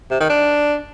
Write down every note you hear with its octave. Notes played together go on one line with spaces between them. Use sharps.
C3
D#3
D4